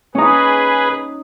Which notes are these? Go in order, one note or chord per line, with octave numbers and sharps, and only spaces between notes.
C#4 D#4 G#4 B4